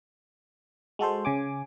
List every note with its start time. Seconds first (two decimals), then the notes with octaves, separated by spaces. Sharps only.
0.99 G#3 F#4 A4 C5
1.25 C#3 G#5 D6